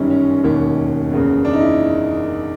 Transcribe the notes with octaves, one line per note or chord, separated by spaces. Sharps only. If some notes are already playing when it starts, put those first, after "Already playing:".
Already playing: G1 F#2 D#3 G3 C#4
C#4
E1 D#2 D#3 C#4
F#1 E2 C#3
D4
D#4
E4